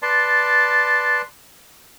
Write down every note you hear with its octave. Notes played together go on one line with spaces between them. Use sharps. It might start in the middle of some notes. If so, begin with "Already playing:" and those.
B4 D5 A5 C6